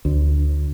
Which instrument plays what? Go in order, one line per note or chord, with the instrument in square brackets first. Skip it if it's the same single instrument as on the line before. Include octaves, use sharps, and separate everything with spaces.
[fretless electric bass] D2